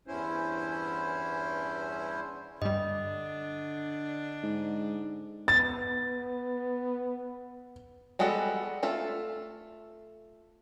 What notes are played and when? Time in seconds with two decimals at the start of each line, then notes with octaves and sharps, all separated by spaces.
0.07 E2 G2 C#4 E4 C5
2.62 G2 D3 G3 D4 D#5
4.43 G#2
5.48 B3 A6
8.19 G3 G#3 B3 F#4 A4
8.83 A3 F4 A4